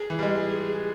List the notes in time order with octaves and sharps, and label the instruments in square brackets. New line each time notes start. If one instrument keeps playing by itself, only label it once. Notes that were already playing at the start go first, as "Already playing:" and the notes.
Already playing: [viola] G#4
[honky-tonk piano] E3
G3
G#3